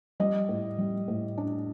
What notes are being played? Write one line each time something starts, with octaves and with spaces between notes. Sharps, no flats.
G3 D#5
A2
G3
A2
D4